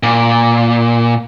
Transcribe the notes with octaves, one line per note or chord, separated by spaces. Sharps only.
A#2